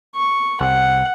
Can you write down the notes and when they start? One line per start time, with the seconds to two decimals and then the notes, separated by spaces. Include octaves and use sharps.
0.16 C#6
0.61 C2 F#5